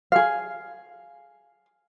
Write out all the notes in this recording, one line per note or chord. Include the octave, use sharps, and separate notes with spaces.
G#4 F5